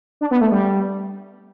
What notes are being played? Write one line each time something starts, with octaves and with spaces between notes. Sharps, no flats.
D4
B3
A3
G3